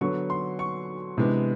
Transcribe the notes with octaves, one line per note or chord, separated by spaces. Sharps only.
D3 F#3 B3 C#6
C6
C#6
C3 E3 G#3 B3 D4